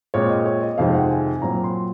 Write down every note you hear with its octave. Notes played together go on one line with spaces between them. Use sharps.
A#2 G#3 C4 C#5
D#5
C#5
D#5
F2 C3 D#3 G#3 C4 F5
F#5
G#5
G#5
A#2 F#3 C4 A#5
C6